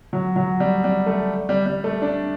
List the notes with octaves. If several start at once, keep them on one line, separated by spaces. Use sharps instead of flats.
F#3
F#3
G3
G3
A3
G3
G3
A3
D4